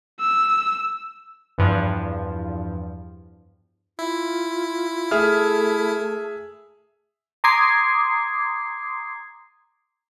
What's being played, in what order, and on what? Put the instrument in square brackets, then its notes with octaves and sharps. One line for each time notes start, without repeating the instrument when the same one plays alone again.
[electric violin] E6
[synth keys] E2 G2 F3
[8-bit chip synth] E4 [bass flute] F4
[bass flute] A3 [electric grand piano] G#4 E5 F6
[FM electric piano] A#5 C6 D6 D#6 G#6 C7